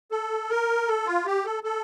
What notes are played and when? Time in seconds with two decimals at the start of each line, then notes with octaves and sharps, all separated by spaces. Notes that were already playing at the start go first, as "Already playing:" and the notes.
0.11 A4
0.49 A#4
0.87 A4
1.06 F4
1.26 G4
1.45 A4
1.64 A4